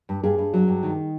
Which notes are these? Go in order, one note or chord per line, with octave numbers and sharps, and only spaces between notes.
G2
G2 G#4
G2
F#3
G2
D#3